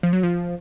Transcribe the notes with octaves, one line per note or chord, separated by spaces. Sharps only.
F3
F#3
F3